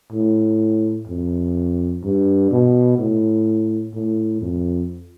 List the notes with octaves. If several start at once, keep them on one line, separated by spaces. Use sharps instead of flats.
A2
F2
G2
B2
A2
A2
F2